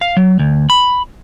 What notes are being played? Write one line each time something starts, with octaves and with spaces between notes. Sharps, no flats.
F5
F#3
D2
B5